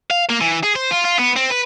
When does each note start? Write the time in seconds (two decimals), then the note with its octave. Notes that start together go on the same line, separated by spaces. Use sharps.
0.11 F5
0.29 A#3
0.41 E3
0.63 G#4
0.76 C5
0.91 F4
1.05 F4
1.19 B3
1.36 C4
1.50 B4